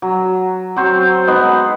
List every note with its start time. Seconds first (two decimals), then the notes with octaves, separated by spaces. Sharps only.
0.02 F#3
0.76 F#3 C4 C5 C#5
1.27 G#3 B3 D#4